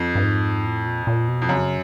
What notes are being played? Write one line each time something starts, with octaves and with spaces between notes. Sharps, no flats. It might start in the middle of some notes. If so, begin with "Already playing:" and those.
Already playing: F2
G2
G#2
A2
A#2
A#2
B2
F2
F#2 C#3